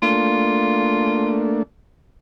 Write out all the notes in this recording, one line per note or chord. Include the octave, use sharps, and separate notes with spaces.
A3 A#3 D4 F4